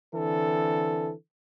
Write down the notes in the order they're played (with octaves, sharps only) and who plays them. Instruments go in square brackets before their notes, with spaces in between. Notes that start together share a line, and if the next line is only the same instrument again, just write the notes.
[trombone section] D3 E3 C4 A4